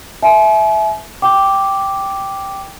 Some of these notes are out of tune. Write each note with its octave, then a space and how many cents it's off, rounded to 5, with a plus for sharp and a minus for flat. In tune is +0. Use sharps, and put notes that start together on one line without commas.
E5 +0 G#5 +45
G5 +0 D6 +0